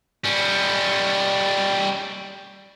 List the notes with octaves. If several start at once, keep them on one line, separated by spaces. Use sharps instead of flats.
G3 C#4